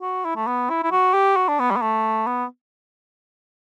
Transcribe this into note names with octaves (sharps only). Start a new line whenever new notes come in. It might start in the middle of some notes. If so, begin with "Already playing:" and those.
F#4
E4
A3
B3
E4
E4
F#4
G4
F#4
D4
B3
G3
B3
A3
B3